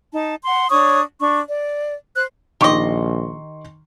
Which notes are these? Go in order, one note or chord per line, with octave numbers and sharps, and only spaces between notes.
D#4 A5
F#5 C6
D4 C#5 C#6 D#6
D4 C#6
D5
C5 F#6
A#1 D#3 G4 D#5 C6 C#6